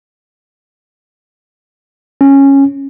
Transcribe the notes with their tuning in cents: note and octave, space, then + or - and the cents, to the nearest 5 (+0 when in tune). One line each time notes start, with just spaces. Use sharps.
C#4 -10